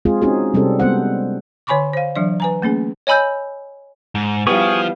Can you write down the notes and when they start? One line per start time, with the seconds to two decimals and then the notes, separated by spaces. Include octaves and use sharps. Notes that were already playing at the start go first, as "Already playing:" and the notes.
0.05 G#3 C4 F4 G#4
0.22 C4 C#4 D#4 F#4 G#4
0.54 C3 G3 C4 C#4 A4
0.80 G3 G#3 B3 C4 C5 F#5
1.67 D3 C#5 G#5 B5 C#6 D6
1.93 C5 F5
2.16 E3 F#3 D4 D5
2.40 B4 G#5 A#5
2.62 A3 A#3 C#4 G#4
3.07 C#5 D#5 G#5 B5 E6 G6
4.15 G#2
4.47 F3 G3 B3 E4 G#4 F5 C#6